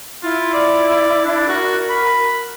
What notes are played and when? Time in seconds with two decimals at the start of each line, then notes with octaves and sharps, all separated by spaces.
0.23 E4 F4
0.54 D5
1.25 D4
1.49 F#4 A#4
1.90 B5